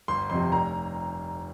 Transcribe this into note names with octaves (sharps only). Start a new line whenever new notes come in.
G1 C6
F2 C3 C6
F1 A#5